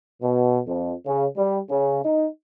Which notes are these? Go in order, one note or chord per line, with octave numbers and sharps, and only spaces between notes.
B2
F2
C#3
G3
C#3
D#4